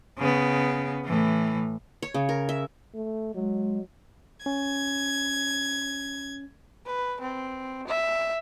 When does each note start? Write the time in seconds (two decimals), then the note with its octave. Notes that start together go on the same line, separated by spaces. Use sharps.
0.18 C#3 B3
1.05 A2 E3
2.02 C#5
2.14 C#3
2.29 A#4
2.49 E5
2.94 A3
3.35 F#3 G#3
4.46 C#4 G#6
6.86 B4
7.21 C4
7.88 E5